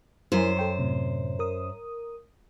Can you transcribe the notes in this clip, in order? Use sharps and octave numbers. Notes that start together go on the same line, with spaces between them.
F#2 E4 A#4 C5 G#5
A4 G5 C#6
A2 C3
A#4 D#6